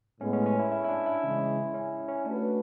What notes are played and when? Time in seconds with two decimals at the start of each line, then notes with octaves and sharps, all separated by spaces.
0.21 A2 G#3 B3 C#4
0.33 C#4
0.46 C#4
0.59 E4
0.72 E4
0.84 E4
0.89 D4
1.06 E4
1.23 C#3 E3 G#3 C#4
1.74 C#4
2.08 C#4
2.25 A3 C#4 D4 F#4 B4